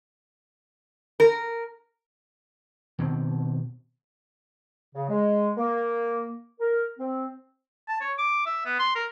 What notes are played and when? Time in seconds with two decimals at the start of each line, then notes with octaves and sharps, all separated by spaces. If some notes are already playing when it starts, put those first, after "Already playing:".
1.20 A#4
2.99 B2 D#3 C4
4.95 C#3
5.09 G#3
5.57 A#3
6.61 A#4
6.99 C4
7.88 A5
8.01 C#5
8.18 D6
8.46 E5
8.65 B3
8.79 C6
8.95 A#4